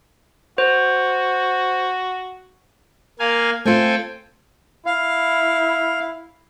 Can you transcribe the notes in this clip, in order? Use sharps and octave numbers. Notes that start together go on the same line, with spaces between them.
F#4 C5
A#3 F5 G#5
A3 C4 F4 A4 G5 G#5
E4 F5